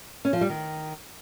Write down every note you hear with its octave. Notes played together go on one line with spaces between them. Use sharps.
C#4
F3
G3
D#3